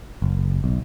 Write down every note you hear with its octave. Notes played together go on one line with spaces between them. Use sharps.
F#1
B1